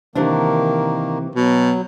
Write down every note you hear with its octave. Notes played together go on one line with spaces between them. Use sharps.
C3 D#3 E3 A#3 D4
B2 F#3